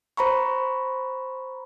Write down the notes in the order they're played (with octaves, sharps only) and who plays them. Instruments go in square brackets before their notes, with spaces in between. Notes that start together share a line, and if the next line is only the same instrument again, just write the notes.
[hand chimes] C5 A#5 B5 C#6